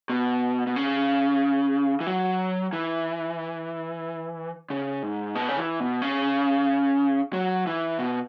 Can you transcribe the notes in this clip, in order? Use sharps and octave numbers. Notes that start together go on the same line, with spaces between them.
B2
B2
C#3
E3
F#3
E3
C#3
G#2
B2
C#3
E3
B2
C#3
F#3
E3
B2